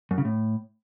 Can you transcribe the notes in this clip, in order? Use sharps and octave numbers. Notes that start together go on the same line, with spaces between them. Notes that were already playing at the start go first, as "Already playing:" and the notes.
F#2
C#3
A2